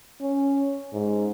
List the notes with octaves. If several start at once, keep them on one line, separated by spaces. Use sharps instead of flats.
C#4
G#2